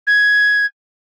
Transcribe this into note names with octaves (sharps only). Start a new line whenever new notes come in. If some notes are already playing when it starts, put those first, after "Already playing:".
G#6